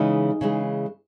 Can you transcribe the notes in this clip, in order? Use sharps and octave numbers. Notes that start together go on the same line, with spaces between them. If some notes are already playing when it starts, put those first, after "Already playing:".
Already playing: C#3 E3 G#3 D#4
C#3 E3 G#3